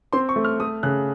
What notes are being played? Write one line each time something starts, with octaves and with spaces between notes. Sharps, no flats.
C4 C6
C#6
A3
F6
A3 D#6
C#3 F#6